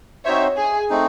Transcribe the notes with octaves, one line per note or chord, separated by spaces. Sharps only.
C4 D#4 F#4 C5 C#5 E5
G#4
A3 C4 D#4